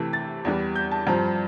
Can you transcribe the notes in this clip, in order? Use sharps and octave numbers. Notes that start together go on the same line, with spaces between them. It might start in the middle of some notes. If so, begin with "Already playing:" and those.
Already playing: C3 E3 A3
A6
E2 E3 G3
G6
A5
G2 F3 C4 A#5